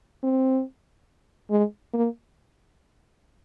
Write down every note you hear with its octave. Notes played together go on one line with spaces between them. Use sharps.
C4
G#3
A#3